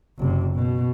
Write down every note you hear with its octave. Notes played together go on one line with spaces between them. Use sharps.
F#1 C3
B2